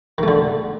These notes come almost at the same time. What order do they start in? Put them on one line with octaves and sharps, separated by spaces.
D#3 A3 D3